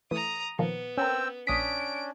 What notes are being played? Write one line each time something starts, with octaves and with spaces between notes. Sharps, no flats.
E3 A3 A#5 D#6
A#2 D#3 F3 B3
C4 C#4 A#4 G5 E6
A#1 C#4 D4 D#6 B6 D7